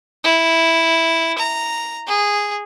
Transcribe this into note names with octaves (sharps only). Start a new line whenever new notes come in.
E4
A#5
G#4